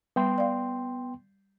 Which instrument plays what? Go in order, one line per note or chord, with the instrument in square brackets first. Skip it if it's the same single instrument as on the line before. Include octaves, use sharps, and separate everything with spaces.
[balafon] G3 [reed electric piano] B3 G5 C6
[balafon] D5 F5